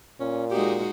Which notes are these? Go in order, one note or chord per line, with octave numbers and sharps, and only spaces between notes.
A#2 C#4
G#3 D#4 F#4 G4